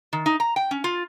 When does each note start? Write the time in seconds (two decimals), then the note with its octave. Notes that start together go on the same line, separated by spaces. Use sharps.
0.13 D#3
0.26 D#4
0.40 A#5
0.56 G5
0.71 C#4
0.84 F4